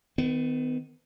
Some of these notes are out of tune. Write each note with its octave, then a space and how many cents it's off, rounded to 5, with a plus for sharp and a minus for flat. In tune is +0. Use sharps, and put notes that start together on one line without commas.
D#3 +0 B3 +35